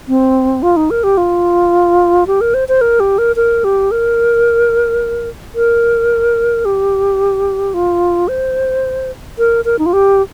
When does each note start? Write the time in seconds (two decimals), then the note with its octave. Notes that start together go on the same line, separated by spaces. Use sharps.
0.08 C4
0.63 F4
0.77 D#4
0.91 A#4
1.04 G4
1.17 F4
2.27 G4
2.41 A#4
2.54 C5
2.68 C5
2.81 A#4
3.00 G4
3.18 A#4
3.36 A#4
3.64 G4
3.91 A#4
5.55 A#4
6.65 G4
7.74 F4
8.28 C5
9.38 A#4
9.65 A#4
9.79 D#4
9.86 F4
9.93 G4